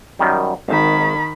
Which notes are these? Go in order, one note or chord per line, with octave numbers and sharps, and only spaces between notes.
F#2 D#3 G3
G#1 D#3 B5